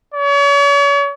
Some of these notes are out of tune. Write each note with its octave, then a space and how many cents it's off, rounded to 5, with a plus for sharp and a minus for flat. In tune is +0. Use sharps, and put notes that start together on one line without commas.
C#5 +40